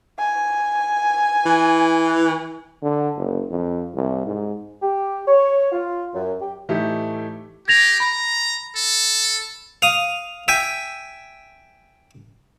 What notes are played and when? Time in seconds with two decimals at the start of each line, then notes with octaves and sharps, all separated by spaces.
0.19 G#5
1.46 E3
2.83 D3
3.17 F#1
3.51 F2
3.95 C2
4.27 G#2
4.82 G4
5.28 C#5
5.72 F4
6.14 F#2
6.41 G4
6.69 A2 E3 A3 D#4 G4
7.68 G4 G#6 A#6 F7
8.00 A#5 B5
8.77 A4
9.82 F5 D#6
10.48 E5 G5 G#5